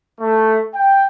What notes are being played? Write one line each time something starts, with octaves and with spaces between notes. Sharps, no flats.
A3
G5